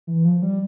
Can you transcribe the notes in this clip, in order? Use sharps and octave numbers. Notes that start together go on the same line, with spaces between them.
E3
F3
G3